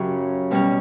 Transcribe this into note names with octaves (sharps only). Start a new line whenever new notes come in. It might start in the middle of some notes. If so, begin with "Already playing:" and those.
Already playing: F#2 C#3 F#3 C#4 G4
B2 G3 C#4